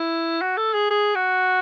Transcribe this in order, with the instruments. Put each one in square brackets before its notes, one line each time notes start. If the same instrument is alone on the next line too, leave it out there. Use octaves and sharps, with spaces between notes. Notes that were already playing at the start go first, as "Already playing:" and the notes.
Already playing: [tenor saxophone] E4
F#4
A4
G#4
G#4
F#4